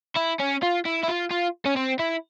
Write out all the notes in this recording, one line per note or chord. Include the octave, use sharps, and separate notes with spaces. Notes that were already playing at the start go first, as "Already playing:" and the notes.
E4
C#4
F4
E4
E4
F4
F4
C#4
C4
E4